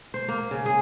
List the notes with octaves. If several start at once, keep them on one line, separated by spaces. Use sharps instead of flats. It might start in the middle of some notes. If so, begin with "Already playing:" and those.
C5
A#3
C#3
G#4